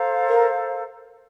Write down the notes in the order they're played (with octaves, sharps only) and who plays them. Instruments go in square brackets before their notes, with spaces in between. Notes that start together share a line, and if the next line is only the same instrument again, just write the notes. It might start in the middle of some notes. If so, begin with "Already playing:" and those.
Already playing: [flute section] A4 C5 F5 A#5
[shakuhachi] A#4